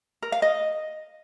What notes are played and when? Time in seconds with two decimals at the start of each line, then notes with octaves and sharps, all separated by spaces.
0.22 A#4
0.32 F5
0.42 D#5